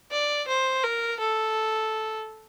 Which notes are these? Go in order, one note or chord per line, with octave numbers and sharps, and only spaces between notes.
D5
C5
A#4
A4